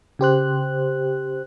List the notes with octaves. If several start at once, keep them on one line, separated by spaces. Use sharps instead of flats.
C#3 G4 C5 F#6